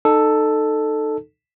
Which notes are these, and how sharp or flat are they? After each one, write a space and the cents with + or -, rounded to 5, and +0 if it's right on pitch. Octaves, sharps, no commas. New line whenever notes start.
D#4 -25 A4 +0